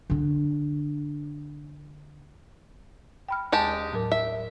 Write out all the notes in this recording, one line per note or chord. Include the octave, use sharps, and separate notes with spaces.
D3 D4
G5 B5 F6
D#2 G#3 G4 A5
A2 F#3 A#4
E5